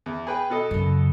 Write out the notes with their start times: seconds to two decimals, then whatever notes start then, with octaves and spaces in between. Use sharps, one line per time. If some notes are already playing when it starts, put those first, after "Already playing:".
0.06 E2
0.27 G#4 B4 G5
0.50 B2 A4 D#5
0.71 F#2 C#3